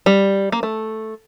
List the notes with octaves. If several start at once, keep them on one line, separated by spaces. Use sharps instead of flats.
G3
A#3
A3